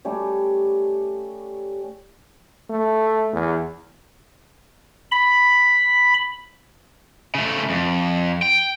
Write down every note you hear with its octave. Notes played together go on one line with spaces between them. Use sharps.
G3 A3 C#4 G4
A3
E2
B5
C#3 A3
F2
G5